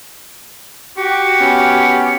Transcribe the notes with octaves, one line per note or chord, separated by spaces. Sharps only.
F#4 G4 C#7
B3 C#4